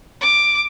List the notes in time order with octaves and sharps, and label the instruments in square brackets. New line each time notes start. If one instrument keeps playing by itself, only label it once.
[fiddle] D6